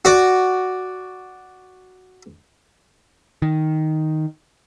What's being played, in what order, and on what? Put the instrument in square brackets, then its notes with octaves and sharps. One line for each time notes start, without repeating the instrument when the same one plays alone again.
[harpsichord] F#4 D5
[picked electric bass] D#3